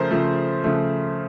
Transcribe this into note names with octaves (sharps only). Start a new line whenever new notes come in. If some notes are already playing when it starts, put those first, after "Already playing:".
Already playing: C#3 F3 A3 A#4 C5
C#3 F3 A3
C#3 F3 A3